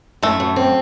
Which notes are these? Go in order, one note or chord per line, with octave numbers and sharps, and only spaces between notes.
F#2 A3
F#2
C4